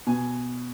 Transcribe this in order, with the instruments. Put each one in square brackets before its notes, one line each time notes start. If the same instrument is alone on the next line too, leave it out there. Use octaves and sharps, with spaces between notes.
[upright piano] B2 G#5